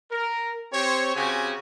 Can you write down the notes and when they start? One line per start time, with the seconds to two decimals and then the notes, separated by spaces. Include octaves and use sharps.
0.11 A#4
0.73 C4 G4 C5 C#5
1.15 C#3 C4 F#4 G4 G#5